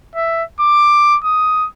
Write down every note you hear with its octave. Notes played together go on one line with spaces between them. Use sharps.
E5
D6
D#6